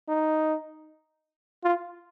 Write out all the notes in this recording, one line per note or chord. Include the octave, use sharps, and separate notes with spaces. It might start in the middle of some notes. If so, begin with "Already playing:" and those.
D#4
F4